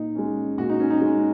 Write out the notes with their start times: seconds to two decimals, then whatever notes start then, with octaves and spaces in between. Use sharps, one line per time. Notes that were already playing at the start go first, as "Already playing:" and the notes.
Already playing: A#2 D#4
0.15 G#3 C#4
0.58 A#2 F#4
0.69 D#4
0.80 C#4
0.90 D#4
1.01 G#3 C#4